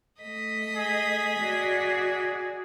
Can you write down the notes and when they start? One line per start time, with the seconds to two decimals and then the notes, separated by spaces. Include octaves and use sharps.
0.22 A3 D#5 B6
0.77 G#4
1.40 F#4 D5